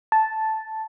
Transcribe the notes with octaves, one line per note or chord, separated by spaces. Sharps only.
A5